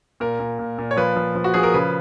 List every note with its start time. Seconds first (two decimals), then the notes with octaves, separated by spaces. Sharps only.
0.20 A#2 A#4
0.40 A#2
0.59 A#2
0.78 A#2
0.91 C#5
0.97 F3 B4
1.16 F3
1.35 F3
1.44 F#4
1.54 F3 G#4
1.63 A#4
1.74 C#3 B4